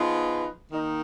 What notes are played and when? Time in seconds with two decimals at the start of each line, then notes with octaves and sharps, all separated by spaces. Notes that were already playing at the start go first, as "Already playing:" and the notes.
Already playing: F3 B3 D#4 G#4 B4
0.71 D#3 A#3 D#4